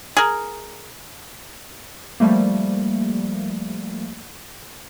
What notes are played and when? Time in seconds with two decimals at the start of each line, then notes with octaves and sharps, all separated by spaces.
0.17 G#4 A#4
2.20 F3 G3 A3 A#3